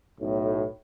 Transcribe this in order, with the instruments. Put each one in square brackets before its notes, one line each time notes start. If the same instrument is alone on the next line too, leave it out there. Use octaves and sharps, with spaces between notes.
[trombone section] B1 A2